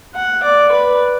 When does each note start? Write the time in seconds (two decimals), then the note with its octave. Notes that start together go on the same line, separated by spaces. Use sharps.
0.14 F#5
0.43 D5
0.71 B4